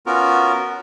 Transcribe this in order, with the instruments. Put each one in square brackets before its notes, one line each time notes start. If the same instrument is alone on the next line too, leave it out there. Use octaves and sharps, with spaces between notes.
[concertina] B3 C#4 F4 F#4 A#4